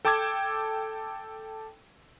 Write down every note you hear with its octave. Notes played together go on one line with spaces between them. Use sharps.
A4 G5 A5 D6 E6 G#6